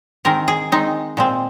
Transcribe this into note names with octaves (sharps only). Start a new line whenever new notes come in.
D#3 G#3 C4 A#4
G#4
D#3 G#3 C4 D#4
A#2 G#3 C4